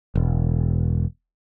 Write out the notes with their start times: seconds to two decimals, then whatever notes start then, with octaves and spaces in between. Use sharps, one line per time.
0.15 E1